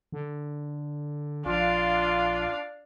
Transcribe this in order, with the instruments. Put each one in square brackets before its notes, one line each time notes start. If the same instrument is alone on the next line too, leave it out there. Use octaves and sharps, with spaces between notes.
[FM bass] D3
[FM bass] A#1 [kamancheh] D4 F5 [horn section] F4